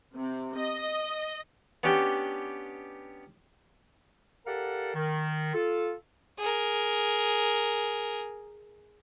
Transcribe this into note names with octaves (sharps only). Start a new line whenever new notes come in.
C3
D#5
B3 C#4 D4 G4 G5
G4 A4 A#4 D5 F5 F#5
D#3
F4 A4
G#4 A#4